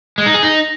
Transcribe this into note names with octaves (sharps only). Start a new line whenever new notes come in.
G#3
D#4
G#4
D#4